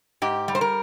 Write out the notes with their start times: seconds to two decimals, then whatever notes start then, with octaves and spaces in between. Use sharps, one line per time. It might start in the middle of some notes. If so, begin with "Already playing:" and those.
0.22 G#2 G4
0.48 G3
0.55 C5
0.61 A#4